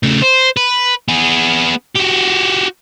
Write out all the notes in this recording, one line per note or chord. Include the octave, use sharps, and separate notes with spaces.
C#3 A3
C5
B4
B3 G#4
F#4 G4